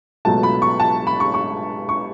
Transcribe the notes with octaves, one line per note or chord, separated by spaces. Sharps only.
C#2 B2 F#3 A3 A5
B5
C#6
A5
B5
C#6
C#6
C#6